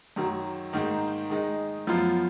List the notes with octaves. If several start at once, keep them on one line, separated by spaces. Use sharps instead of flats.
F#2 D#3 F#3
G#2 D#3 A#3 D#4
D#3 G#3 D#4
F#2 F3 B3 F4